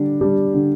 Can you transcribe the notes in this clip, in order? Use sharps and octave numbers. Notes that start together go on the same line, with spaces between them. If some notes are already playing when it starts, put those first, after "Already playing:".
Already playing: D3 G3 D4
G3 D4 G4
D3